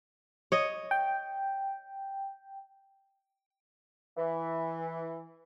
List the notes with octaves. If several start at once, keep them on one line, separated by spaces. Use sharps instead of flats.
C#5 D#5
G5
E3